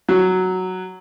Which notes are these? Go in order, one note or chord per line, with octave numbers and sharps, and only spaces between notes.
F#3